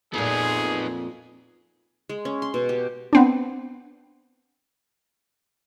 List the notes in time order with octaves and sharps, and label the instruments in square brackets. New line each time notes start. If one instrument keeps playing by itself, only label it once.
[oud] F2 A#2 [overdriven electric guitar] B3 D#4 [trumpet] G#4
[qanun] G#3
C#4
C6
B2
G4
[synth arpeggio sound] B3 C4 D4